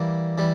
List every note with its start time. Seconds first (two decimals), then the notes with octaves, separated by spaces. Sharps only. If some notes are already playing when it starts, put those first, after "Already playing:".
Already playing: E3 G3 A#3
0.38 E3 G3